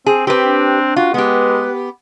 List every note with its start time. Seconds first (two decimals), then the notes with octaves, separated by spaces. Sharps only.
0.06 C4 G#4
0.27 C4 G4 B4
0.43 D4
0.96 F4 F#4
1.14 G#3 B3 G4 B4